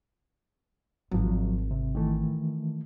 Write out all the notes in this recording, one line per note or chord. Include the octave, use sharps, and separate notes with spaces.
G#1 F3 F#3
C3
D#3 E3 A3